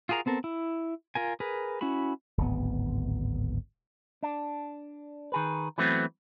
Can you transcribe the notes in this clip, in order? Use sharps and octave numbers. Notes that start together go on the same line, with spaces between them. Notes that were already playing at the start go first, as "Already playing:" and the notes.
F4 F#4 G#4 A#4 A#5
B3 C4 A4 A#4
E4
F4 A#4 G#5
G#4 A#4 B4
C#4 E4 F#4 B5
D1 G#1 B3
D4
D#3 G#4 B4
E3 F#3 A3 B3 C4